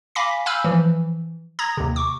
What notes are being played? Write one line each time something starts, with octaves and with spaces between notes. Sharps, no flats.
F5 G#5 B5 D6 A#6 B6
F5 G#5 B5 E6 F6 G6
E3 F3
A#5 D#6 G#6 A#6
D#2 C3
C#6 D6